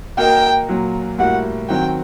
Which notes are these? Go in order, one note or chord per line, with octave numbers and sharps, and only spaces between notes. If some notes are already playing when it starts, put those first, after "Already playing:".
A#3 F#4 A#4 D#5 G5
A#2 F#3 A#3 F#4
A2 G3 A#3 F#4 F#5
D#3 F#3 C4 F#4 G5